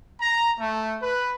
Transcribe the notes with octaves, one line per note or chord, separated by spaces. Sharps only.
A#5
A3
B4